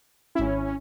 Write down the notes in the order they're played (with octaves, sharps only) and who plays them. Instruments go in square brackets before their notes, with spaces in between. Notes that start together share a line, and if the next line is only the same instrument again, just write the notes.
[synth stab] G#1 E4 [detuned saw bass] C#4